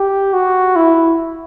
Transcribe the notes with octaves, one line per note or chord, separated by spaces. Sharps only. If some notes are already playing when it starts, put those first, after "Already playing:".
Already playing: G4
F#4
E4